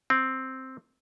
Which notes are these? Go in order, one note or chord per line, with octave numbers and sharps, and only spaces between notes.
C4